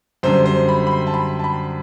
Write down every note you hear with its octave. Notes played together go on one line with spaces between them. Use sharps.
F#2 D3 G3 C5
C5
B5
B5
C6
A5
B5
A5
B5